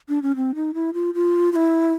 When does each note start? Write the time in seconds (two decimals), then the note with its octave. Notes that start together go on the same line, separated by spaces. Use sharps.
0.09 D4
0.22 C#4
0.36 C4
0.55 D#4
0.74 E4
0.94 F4
1.14 F4
1.52 F4
1.56 E4